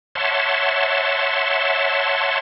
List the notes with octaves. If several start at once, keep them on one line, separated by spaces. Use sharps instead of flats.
C#5 E5 F#5 A5 C6